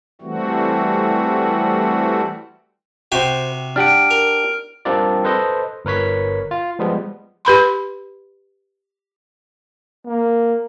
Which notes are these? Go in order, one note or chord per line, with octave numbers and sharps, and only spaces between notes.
E3 G3 A3 C4 F#4
C3 F#4 C5 G5 C6
D4 G4 F#5 F6 D7
A#4
G3 C4 D4 F4 A#4 D5
A4 B4 C5 D#5
G1 A#4 B4 C#5 B6
F4
F3 G3 G#3 B3
G4 B4 B5 C6
A#3